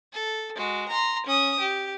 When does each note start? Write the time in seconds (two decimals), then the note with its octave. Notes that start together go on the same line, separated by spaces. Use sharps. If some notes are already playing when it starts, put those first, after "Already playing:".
0.13 A4
0.55 G#3 F#4
0.89 A#5 C6
1.26 C#4 D#6
1.60 G4